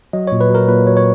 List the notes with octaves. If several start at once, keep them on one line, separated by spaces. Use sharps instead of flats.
F#3 D#5
A#2 C#5
B4
F#3 A#4
A#2 B4
F#3 C#5
C#5